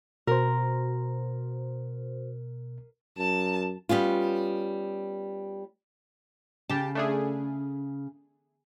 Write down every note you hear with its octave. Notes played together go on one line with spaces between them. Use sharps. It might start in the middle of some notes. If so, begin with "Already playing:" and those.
B2 F#4 A#4 C5
F#2 A5
G3 B3 C#4 F4
C#3 G4 A5
A3 D4 G#4